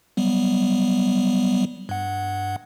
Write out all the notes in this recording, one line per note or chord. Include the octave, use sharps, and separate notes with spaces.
F#3 G3 B3
G2 F#5